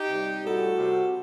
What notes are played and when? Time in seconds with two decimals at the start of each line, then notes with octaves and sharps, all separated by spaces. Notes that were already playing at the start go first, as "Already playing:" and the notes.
Already playing: D#4 G4
0.09 C3 G3
0.43 A2 G3 F#4 A4
0.76 C3 G3